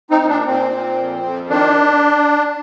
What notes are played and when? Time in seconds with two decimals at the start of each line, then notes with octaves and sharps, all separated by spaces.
0.10 C4 D#4
0.19 A#2
0.28 D4
0.45 A#2 C4
0.71 A#2
0.98 F2
1.23 F2
1.49 D#3 D4